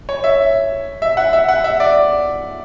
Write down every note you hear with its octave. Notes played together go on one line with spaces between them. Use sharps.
C#5
E5
E5
F#5
E5
F#5
E5
D5